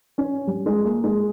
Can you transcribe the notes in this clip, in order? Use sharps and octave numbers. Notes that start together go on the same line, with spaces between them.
C#4
G3
G#3
A#3
G#3